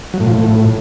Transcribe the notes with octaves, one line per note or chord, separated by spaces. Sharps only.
F#3
A2
F3
A2